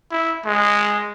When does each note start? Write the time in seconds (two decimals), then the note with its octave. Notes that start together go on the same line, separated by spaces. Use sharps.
0.12 E4
0.46 G#3